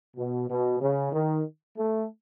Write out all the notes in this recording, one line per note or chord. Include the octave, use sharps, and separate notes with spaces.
B2
B2
C#3
D#3
A3